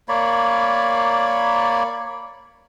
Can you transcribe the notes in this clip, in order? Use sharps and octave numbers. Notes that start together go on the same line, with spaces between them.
A#3 C#5 D5 B5